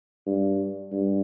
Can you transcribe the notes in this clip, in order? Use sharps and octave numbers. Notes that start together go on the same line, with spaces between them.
G2
G2